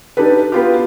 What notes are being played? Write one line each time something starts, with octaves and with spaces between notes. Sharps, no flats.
D4 D#4 G4 A4 B4
B3 F4 G4